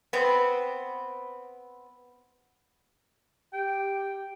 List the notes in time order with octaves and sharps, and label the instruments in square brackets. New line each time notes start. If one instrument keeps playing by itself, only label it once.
[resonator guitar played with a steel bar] B3 C4
[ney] G4 [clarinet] G5